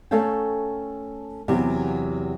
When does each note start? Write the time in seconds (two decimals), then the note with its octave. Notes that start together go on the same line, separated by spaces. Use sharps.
0.11 A3 C#4 A4 C#5 F5 G5
1.48 E2 C3 F#3 G4